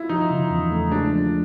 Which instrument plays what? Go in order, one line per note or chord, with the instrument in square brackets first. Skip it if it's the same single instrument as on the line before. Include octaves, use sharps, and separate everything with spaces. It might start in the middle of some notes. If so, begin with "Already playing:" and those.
Already playing: [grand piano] E4 F4
[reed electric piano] F3 [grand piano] D#4
[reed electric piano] C#3
E2
A3
[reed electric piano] G#3 [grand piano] D4
[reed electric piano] F3